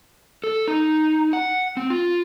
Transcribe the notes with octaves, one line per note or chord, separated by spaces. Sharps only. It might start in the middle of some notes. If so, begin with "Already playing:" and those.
A4
D#4
F#5
C4
F4